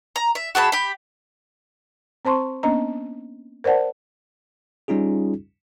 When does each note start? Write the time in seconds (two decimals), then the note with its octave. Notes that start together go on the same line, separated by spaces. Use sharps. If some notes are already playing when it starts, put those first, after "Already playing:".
0.16 A#5
0.35 E5
0.55 F#4 G#4 A5 B5
0.72 G4 B5
2.25 C4 C5 A5 C6 C#6
2.63 A#3 B3 C#4 D4 D#5 A#5
3.64 A#4 C5 D5 F#5 A5
4.88 G3 C#4 D#4 F4 G#4